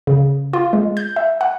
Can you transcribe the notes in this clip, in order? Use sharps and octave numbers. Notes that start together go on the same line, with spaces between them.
C#3
F4
G#3
G6
E5
F#5